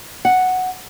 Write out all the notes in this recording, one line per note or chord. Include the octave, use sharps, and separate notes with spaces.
F#5